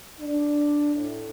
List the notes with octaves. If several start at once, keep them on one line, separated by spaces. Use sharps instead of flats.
D4
A2